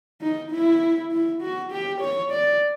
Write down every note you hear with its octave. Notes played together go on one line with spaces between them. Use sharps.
D#4
E4
E4
F#4
G4
C#5
D5